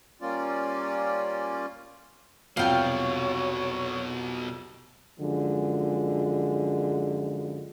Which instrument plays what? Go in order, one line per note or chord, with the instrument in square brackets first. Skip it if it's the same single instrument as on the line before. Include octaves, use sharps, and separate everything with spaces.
[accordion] G3 A#3 C#4 F4 D5
[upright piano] C2 F2 [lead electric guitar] B2 F#3 [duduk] C#5 [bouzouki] F5 G5
[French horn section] F#2 D3 F3 G#3